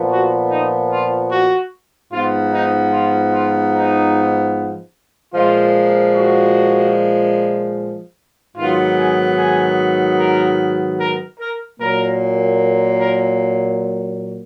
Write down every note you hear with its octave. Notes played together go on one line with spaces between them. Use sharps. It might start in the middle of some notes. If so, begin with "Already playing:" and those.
Already playing: A#2 F3 B3
F#4
D#4
F4
F#4
G#2 F3 B3 F4
D#4
F4
F4
D#4
A#2 F3 G#3 F4
F#4
G#2 D#3 F#3 B3 F4
G#4
G#4
A#4
A#4
A#4
A#2 F#3 A#3 A#4
A#4